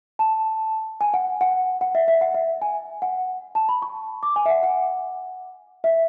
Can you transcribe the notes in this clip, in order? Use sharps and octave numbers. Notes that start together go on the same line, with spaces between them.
A5
G#5
F#5
F#5
F#5
E5
E5
F#5
E5
G#5
F#5
A5
B5
C#6
D6
G#5
E5
F#5
F#5
E5